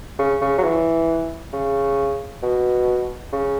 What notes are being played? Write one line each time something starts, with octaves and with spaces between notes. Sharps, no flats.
C#3
C#3
F#3
E3
C#3
B2
C#3